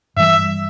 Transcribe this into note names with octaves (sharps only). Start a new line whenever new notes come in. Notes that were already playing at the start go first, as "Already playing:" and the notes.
G2 E3 G3 E5